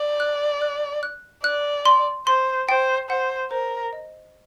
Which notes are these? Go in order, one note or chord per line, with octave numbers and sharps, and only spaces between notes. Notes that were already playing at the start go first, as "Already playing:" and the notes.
Already playing: D5
F#6
F#6
F#6
D5 F#6
C6
C5 C6
C5 G5
C5 F#5
A#4 C5
D#5